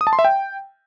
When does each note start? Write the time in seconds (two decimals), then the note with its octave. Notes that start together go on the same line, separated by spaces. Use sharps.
0.01 D#6
0.07 A5
0.13 C6
0.19 E5
0.25 G5